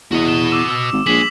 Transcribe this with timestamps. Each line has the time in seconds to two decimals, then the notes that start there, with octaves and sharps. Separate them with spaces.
0.12 E2 F#4 D#5
0.29 E7
0.51 D6 E6 E7
0.70 E6
0.93 G#1
1.06 A#1 G#3 B6 E7 F#7